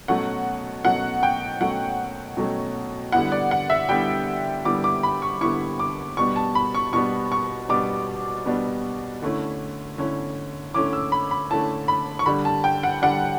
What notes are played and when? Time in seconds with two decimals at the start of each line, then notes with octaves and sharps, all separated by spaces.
0.08 B2 F#3 A3 C#4 F#5
0.84 B2 F#3 A3 C#4 F#5
1.23 G5
1.61 B2 F#3 A3 C#4 F#5
2.37 B2 F#3 A3 C#4
3.12 D3 G3 B3 E4 F#5
3.32 D5
3.51 F#5
3.70 E5
3.89 D3 G3 B3 E4 G5
4.65 D3 G3 B3 E4 D6
4.84 D6
5.03 B5
5.22 C#6
5.41 D3 G3 B3 E4 C#6
5.79 D6
6.17 B2 G3 B3 D4 C#6
6.36 A5
6.55 B5
6.74 C#6
6.93 B2 G3 B3 D4 C#6
7.32 C#6
7.69 B2 G3 B3 D4 D6
8.46 B2 G3 B3 D4
9.22 D3 A3 C#4 E4
9.98 D3 A3 C#4 E4
10.74 D3 A3 C#4 E4 D6
10.93 E6
11.12 B5
11.31 B5
11.50 D3 A3 C#4 E4 A5
11.88 B5
12.19 C#6
12.26 D3 G3 D4 B5
12.45 A5
12.64 G5
12.83 F#5
13.02 D3 G3 D4 F#5